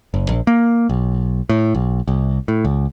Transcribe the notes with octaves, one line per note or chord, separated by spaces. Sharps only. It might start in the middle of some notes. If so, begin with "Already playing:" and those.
F#1
A#1
A#3
B1
A2
B1
C2
A2
C#2